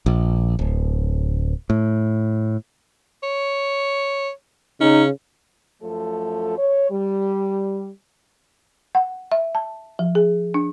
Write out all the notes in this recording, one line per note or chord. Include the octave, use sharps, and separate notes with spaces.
A#1
D1
A2
C#5
C#3 C#4 D#4
F#2 F3 A3 A4
C#5
G3
F#5
E5
A5
F3
G#4
D4